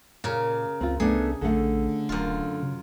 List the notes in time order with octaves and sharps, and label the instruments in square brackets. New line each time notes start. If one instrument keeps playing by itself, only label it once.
[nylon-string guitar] A#2 [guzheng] C#3 A#4
[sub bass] C#2 [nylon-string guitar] C4 F4
[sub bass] C2 [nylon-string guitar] A3 B3 D4 [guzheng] G#4
[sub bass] A#1 [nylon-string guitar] D3 A3
[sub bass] D1 [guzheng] F#2 F4
[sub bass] C#3